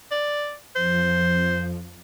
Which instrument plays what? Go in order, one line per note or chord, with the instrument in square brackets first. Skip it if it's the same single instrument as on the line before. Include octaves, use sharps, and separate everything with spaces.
[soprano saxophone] D5
[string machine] F2 F3 [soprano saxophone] C5